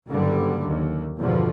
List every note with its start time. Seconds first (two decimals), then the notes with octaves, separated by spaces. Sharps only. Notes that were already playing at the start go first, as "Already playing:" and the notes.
0.10 F#1 G2 D3 G3
0.67 D#2
1.18 G1 E2 B2 D3 F3